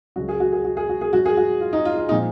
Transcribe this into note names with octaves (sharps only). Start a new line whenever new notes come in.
C#2 C#3 F#3 F#4
G#4
F#4
G#4
F#4
G#4
F#4
G#4
G#2 F#3 F#4
G#4
F#4
F4
D#4
F4
F4
A#2 F3 D#4